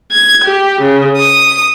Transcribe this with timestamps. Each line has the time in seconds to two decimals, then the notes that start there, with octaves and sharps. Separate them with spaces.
0.12 G#6
0.45 G4
0.82 C#3
1.17 D#6